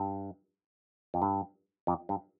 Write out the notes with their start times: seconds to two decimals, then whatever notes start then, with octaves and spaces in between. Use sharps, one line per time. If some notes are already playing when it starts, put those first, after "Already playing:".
Already playing: G2
1.14 F2
1.22 G2
1.87 F2
2.09 G2